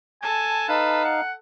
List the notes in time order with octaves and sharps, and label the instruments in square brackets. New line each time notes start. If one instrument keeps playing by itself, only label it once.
[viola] A4 A5 [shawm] G#5
[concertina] D#4 F5 [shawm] B4
[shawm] F#5